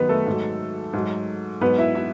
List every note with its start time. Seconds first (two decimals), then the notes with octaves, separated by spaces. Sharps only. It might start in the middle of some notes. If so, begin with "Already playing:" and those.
Already playing: F#2 D#3 F#3 B3 D#4 B4
0.09 A3 A4
0.27 G#2 F#3
0.93 G#2 F#3
1.61 G#2 F#3 B3 B4
1.78 E4 E5
1.95 E4 E5